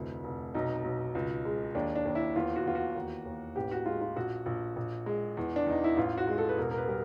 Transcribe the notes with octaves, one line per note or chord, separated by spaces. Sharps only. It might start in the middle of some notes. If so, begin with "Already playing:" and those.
Already playing: F1 D2 E4
F1
B1 D#4
B1
C#2
G#3
D#2 D4
D4
D#2
E4
E2 F4
F#4
E2 F4
F#4
D#2
D#2
A1 G4
F#4
G#3 F4
F4
A#1 F#4
A#1
A#1
G#3
E2
D4
E2 D#4
E4
A1 F4
F#4
G#3
A4
B4
E1 A#4
A#4
B4
G3 A#4